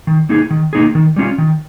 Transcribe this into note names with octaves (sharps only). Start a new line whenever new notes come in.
D#3
A#3 D#4 G#4
D#3
A#3 D#4 G#4
D#3
G3 C#4 F4
D#3